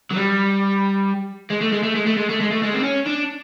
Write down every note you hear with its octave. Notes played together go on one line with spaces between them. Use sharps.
F#3
G3
G#3
A3
G#3
A3
G#3
A3
G#3
A3
G#3
A3
G#3
C4
C#4
D4